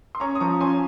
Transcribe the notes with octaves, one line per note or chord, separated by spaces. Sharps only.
C6
C#4 A#5 C#6
D#6
F3 A#5 C#6
C#4 G#5 C6